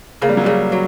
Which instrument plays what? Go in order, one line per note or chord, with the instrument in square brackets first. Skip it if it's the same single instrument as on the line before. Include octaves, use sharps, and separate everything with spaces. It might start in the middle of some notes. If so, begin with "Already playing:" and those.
[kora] C#3 [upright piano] A#3
[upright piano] G3
F#3
[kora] C#3 [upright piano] G3
[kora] F#3